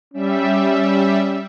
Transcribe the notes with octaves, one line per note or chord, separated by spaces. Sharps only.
G3 C#4 E5